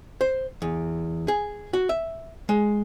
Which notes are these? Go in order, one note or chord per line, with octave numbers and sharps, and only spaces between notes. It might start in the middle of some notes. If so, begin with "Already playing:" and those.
C5
E2
G#4
F#4
E5
G#3